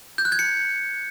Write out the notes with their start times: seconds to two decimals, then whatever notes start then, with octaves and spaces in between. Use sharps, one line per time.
0.18 G6
0.25 F#6
0.32 G#6
0.39 C#7